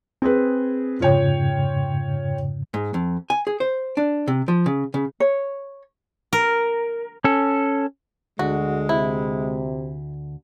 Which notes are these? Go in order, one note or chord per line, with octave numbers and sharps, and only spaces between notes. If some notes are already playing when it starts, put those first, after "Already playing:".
C4 G#4 B4
F2 G#2 C#3 F4 C#5 G5
G#2
F2
G#5
G#4
C5
D4
C3
F3
C#3
C#3
C#5
A#4
C#4 A4
D2 D3 G#3 F#4
C3 E4